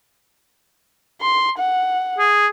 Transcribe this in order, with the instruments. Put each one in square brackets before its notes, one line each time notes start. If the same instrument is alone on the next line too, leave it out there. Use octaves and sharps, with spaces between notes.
[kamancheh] C6
F#5
[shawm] G#4